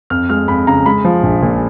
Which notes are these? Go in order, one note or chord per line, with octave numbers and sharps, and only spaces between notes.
F2 F6
G#3 F6
F2 B5
C#3 A#5
G#3 B5
F3
A#1
A#2